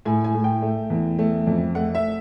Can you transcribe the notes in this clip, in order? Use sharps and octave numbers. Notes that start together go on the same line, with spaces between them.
A2 G#5
G#5
A2
G5
A3
E2
A3
F2
A3 F#5
E5